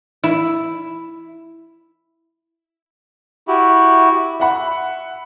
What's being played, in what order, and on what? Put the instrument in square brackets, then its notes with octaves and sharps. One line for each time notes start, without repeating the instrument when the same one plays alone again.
[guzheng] E4
[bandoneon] E4 F#4 G4
[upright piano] E5 F#5 B5